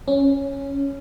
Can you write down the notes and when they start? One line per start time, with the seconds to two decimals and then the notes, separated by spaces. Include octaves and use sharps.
0.08 C#4